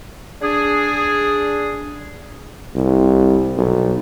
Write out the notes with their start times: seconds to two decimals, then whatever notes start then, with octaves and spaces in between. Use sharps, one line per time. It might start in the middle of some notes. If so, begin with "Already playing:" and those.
0.42 D4 G#4
2.75 C2
3.57 B1